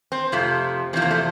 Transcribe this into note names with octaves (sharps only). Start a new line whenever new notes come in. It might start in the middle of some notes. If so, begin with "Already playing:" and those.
C4
F2 C3 F3 A3
E2 C3 F3 C4
A#3
A3